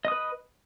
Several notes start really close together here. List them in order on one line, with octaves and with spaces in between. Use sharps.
D#5 D#6 B4